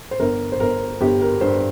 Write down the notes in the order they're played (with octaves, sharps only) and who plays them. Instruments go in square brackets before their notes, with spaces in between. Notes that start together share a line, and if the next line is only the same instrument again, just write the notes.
[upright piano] C5
G1 A#4
C5
G1 A#4
G1 G4
A#4
G2 C5